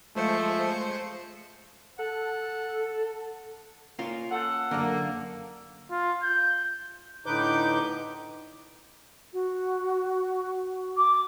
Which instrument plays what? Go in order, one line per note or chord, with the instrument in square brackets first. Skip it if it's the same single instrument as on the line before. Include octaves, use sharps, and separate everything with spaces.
[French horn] F3 [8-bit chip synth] G#3 C5 C#7 [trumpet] A3
[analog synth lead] A4 [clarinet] F#5
[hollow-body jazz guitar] A#3 C#4 F4
[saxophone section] A4 F#5
[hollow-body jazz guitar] F#2 D3 [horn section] A#3
[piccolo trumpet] F4
G6
[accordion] A2 D3 D#4 B4 D6 G6
[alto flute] F#4
[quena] D6